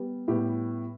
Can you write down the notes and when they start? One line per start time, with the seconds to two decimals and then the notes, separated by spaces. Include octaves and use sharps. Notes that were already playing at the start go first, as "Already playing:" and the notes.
Already playing: G3 B3
0.28 A2 G3 B3 G4